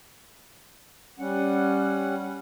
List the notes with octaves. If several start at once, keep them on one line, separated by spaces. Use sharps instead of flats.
G3 C#4 F#5